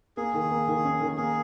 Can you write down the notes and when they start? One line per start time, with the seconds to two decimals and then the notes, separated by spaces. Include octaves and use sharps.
0.17 A#3 G#4
0.34 D#3
0.51 A#3
0.68 D#3
0.84 C#4
1.01 D#3
1.17 A#3 G#4